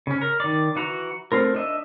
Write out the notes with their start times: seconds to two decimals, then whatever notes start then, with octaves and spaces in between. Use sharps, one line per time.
0.07 C#3 C#4
0.22 A#4
0.40 D#3 D5
0.76 E3 F#4 A#5
1.32 A3 C4 F4 A#4
1.55 D4 D#5 E5